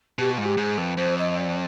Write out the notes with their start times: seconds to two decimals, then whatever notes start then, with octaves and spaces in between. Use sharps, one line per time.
0.19 B2 G4
0.31 F4
0.38 G#2
0.45 G4
0.57 G#2 G#4
0.77 F2 B4
0.97 F2 C5
1.17 D#5
1.37 D5